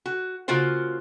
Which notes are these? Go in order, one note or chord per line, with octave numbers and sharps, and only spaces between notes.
F#4
C#3 A#3 F4 F#4 C5